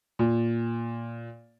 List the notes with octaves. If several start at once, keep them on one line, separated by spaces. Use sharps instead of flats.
A#2